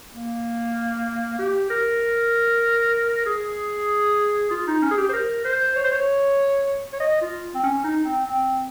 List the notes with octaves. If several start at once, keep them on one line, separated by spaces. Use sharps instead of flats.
A#3
G4
A#4
G#4
F4
D#4
C#4
G#4
G4
C5
A#4
C5
C#5
C5
C#5
C#5
D#5
F4
C4
C#4
D#4
C4
C4